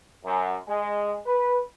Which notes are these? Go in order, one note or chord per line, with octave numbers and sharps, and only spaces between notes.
F#2
G#3
B4